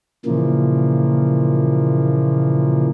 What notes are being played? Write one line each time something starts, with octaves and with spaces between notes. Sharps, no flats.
A#2 C#3 E3 F3 A#3